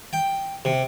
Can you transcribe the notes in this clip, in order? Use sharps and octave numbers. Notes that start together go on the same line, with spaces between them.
G5
C3